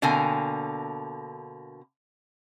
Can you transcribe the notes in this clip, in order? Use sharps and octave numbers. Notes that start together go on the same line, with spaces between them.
B2 D3 A#3 C4 G#5